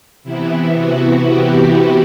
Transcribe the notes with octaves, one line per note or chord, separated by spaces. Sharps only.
C3 E3 B3 E4
F#4
G4